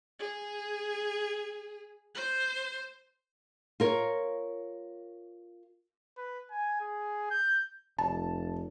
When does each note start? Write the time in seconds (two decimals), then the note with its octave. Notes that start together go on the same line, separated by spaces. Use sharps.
0.20 G#4
2.15 C5
3.80 F4 A#4 C#5
6.17 B4
6.51 G#5
6.80 G#4
7.30 G6
7.98 F1 A5